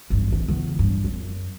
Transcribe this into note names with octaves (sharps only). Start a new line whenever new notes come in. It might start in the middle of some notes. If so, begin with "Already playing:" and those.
A1 G2
E3
E2 C#3
G2
F#2